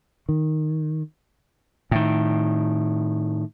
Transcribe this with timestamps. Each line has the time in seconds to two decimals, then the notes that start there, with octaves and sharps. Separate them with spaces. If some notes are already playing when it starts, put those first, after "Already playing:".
0.29 D#3
1.91 A2 D#3